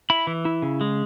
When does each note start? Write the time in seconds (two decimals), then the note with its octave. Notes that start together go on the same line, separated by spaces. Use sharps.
0.10 E4 B5
0.27 E3
0.45 E4
0.62 C#3
0.81 G#3